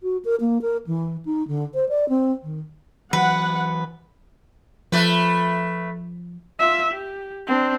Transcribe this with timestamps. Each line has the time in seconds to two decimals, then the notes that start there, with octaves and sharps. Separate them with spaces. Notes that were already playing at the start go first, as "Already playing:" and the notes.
0.03 F#4
0.25 A#4
0.40 A#3
0.62 A#4
0.87 E3
1.25 D#4
1.48 D3
1.74 C5
1.89 D5
2.09 C4
2.43 D#3
3.13 E3 F#3 B4 F#5
4.92 F3 A3 B4
6.59 F4 E5
6.92 G4
7.47 C4 D4